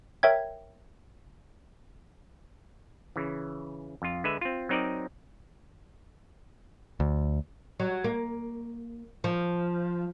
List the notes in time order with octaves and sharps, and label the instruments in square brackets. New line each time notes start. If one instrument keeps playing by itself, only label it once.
[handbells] A#4 C#5 E5 G5 G#6
[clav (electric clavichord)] C#3 E3
F2 F4
D3 G#3 B4 E5
C4 F4
F#3 C4 D#4 A#4 D5 D#5
[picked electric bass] D2
[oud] F#3
A#3
F3